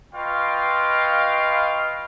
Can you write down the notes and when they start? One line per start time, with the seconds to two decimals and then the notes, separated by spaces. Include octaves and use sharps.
0.13 F4 B4 D#5 F5 G5 C#6